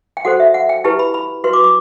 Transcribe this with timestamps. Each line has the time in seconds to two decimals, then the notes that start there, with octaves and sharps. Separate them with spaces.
0.17 G5
0.25 F#4 A4 C5 F#5
0.40 E5
0.54 F#5
0.69 G5
0.84 E4 G4 B4 A5
0.99 B5
1.14 B5
1.44 F#4 B4 C6
1.53 D6
1.64 D6